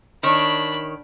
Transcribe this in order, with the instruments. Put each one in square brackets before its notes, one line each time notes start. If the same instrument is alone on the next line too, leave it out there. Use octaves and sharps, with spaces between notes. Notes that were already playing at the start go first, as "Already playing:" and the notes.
[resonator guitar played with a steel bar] D#3 C#5 [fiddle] D4 B5